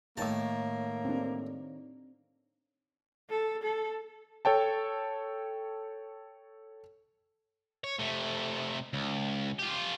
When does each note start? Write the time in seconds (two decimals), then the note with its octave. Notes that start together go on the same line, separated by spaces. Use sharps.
0.17 A2 D#3 A#3 C#5 A5
1.05 C4 D4
3.30 A4
3.63 A4
4.45 A4 C#5 G5 A5
7.84 C#5
7.99 C3 A3
8.93 C#2
9.59 F4 G4